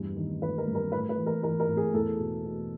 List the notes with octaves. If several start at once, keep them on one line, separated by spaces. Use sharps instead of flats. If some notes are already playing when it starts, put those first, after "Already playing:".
Already playing: E2 G2
D#3
D#3 B4
A#4
G2
A#4
A2 B4
B4
E3
A#4
E3 A#4
A#4
A2
G#4
E2 A4
B2
B2